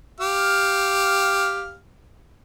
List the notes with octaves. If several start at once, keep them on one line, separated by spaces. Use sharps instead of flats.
G4 F5 F6